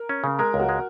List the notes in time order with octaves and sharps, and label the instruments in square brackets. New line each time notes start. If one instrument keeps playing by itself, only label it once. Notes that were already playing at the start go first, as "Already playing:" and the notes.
Already playing: [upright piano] A#4
[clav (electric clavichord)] C#4
C#3
[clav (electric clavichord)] G#3 [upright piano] A#4
[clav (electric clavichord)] C#2
[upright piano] F#4
[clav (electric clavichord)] G#3